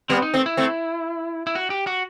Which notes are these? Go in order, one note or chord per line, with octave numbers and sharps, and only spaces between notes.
G3 B3 C4
D#4
A3 C4
E4
A3 C4
E4
F#4
G4
F#4